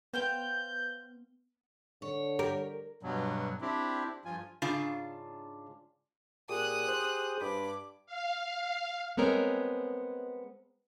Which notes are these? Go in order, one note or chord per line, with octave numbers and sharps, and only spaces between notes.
B3 C5 F5 G5 G6
D3 C#5
G4 A#4
G2 B2 F#3
C4 D4 E4 G4
G2 F3 F4 G#5
G#2 C#3 D4 F4
A#2 G4 G#4 D#6 F#6
C5
G2 B5 D6
F5
G#3 B3 C4 A#4 C#5 D#5